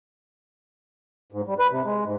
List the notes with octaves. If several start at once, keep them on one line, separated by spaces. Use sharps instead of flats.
G#2
G3
B4
C3
G#3
G#2